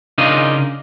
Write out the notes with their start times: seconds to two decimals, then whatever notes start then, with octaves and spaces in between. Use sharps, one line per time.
0.18 C#3 D4 D#4 F4 A#4 D#5